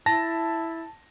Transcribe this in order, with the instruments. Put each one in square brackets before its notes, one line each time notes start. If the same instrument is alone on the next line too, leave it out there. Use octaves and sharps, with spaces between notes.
[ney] E4 [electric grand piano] A5 A#6